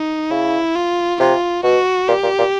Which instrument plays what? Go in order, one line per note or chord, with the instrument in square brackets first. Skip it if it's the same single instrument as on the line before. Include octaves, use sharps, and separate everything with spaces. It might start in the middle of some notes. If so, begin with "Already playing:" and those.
Already playing: [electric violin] D#4
[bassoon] C#3 [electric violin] E4
[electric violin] F4
[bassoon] C3 [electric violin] F4
[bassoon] B2 [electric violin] F#4
[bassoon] A#2 [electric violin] G4
[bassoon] A#2
A#2